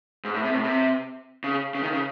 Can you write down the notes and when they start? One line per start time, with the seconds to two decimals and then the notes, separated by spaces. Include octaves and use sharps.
0.25 G#2
0.34 A2
0.44 C3
0.54 A2
0.64 C3
1.44 C#3
1.75 C#3
1.83 D#3
1.93 C#3